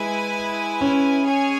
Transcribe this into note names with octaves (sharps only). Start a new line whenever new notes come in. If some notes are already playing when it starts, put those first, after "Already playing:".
Already playing: G#3 E4 B4 G#5
C#4
G#4 C#5 G#5